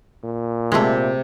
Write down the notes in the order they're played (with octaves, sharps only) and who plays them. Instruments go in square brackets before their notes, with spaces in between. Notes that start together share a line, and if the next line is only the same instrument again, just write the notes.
[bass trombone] A#2
[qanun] C3 B5 [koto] G#3 A3